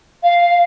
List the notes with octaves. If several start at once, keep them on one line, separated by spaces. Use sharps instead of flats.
F5